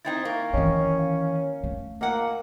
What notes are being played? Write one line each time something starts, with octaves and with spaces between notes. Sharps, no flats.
C4 D#4 E4 G5 G#6 A6
A#3 G5 C#6
D#3 E3 C#4 D#5 C#6
F5
A3
A#2 A#3 A#4 D#5 F5 F#5